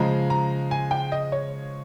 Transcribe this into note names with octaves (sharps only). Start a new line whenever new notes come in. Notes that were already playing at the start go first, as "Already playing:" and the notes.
Already playing: C#3 F3 G#3 A#5
A#5
G#5
G5
D#5
C#5